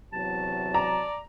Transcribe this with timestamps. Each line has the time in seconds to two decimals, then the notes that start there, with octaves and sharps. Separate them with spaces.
0.13 E2 C3 F#3 A5
0.74 D5 A#5